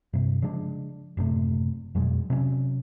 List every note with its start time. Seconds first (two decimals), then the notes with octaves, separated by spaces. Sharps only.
0.13 G2 C3
0.42 C#3 F3 G#3 D4
1.17 F#1 A2 C3 A3
1.95 F2 B2 F#3 G#3
2.30 C3 F#3 C#4